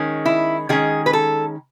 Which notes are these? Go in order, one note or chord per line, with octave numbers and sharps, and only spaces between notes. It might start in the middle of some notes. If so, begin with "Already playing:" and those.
Already playing: D#3 G#3 C#4
E4
D#3 G#3 C#4 G#4
B4
A4